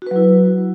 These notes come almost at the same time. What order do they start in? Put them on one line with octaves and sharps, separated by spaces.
F#4 B4 F#3 E4